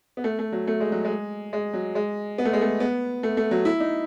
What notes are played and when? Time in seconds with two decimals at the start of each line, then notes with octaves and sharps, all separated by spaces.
0.17 B3
0.24 A3
0.39 A3
0.52 F#3
0.68 A3
0.80 G#3
0.92 F#3
1.05 G#3
1.53 G#3
1.74 F#3
1.95 G#3
2.38 B3
2.45 A3
2.53 G#3
2.61 A3
2.80 B3
3.23 A3
3.37 A3
3.51 F#3
3.65 E4
3.80 D#4